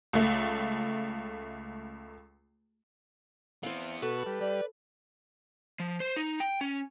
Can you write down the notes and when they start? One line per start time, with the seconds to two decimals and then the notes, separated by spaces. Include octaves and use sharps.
0.13 C#2 A3
3.63 E3 B3 C4 F5
4.02 B2 F#4 A4 B4 C#6
4.26 G3
4.41 G3 D5
5.80 F3
6.00 C5
6.16 D#4
6.40 G5
6.61 C#4